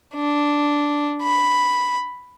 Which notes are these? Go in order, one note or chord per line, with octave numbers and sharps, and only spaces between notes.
D4
B5